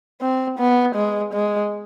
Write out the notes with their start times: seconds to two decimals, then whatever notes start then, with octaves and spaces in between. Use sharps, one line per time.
0.21 C4
0.59 B3
0.95 G#3
1.33 G#3